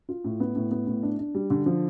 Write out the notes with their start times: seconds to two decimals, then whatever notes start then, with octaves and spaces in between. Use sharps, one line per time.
0.09 F4
0.24 A2
0.40 B3
0.55 A2
0.71 B3
0.87 A2
1.03 D4
1.18 D4
1.35 G3
1.50 D3
1.66 F3